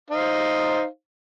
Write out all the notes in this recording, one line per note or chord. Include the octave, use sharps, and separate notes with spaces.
D#4 C5 F5